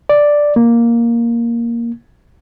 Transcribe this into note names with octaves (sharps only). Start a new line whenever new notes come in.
D5
A#3